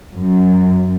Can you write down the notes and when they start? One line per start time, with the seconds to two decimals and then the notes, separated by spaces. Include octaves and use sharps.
0.16 F#2